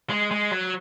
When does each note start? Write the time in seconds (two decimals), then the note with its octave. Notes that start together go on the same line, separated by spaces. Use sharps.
0.10 G#3
0.31 G#3
0.51 F#3